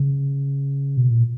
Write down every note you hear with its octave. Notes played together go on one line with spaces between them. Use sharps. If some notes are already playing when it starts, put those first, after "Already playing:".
Already playing: C#3
B2
A#2